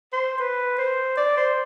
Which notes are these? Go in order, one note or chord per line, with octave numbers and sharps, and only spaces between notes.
C5
B4
C5
D5
C5